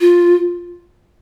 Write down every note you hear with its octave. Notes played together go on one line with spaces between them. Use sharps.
F4